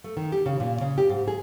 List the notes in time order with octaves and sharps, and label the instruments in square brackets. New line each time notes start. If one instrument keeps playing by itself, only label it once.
[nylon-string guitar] A3
D#3
G4
C#3
A#2
C#3
G4
G#2
G#4